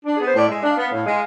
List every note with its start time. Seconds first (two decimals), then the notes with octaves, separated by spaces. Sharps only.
0.05 D4
0.17 B3 G#4
0.27 C5
0.34 A2 D5
0.49 G#3 E5
0.62 D4
0.70 F5
0.77 B3
0.91 A2
1.05 G#3